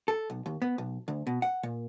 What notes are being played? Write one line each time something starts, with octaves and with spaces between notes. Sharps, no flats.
A4
B1
D#2
B3
B1
D2
B2
F#5
A#2